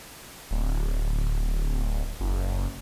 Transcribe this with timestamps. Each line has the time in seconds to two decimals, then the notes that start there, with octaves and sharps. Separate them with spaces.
0.51 D1
2.20 F#1